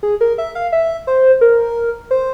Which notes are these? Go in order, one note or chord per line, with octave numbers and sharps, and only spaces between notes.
G#4
A#4
E5
F5
E5
C5
A#4
C5